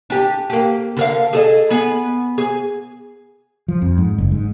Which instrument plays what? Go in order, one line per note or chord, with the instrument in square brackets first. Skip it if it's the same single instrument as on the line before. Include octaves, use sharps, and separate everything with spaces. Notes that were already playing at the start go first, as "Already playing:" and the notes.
[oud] D4 G4
A#3 G4
D3 A#4 F5
G#4 A4 D#5
B3 G#4
G#4
[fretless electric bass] F3
F2
G#2
F#1
G#2